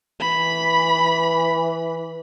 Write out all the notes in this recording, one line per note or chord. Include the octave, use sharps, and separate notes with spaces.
E3 B5